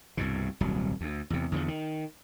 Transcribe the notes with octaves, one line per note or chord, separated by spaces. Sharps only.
C2 G2 B2
D#1 C2 F#3
D2
E2 C3
E2 D3 D#3 F3
D#3